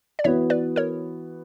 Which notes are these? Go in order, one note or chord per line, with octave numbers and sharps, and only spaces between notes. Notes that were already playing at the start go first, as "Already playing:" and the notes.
D5
E3 B3 F#4 C#5 E5
B4 D5
A#4 C#5